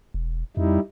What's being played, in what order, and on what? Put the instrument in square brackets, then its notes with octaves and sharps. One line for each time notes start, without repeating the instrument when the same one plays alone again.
[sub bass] E1
[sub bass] F2 [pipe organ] G3 D#4 E4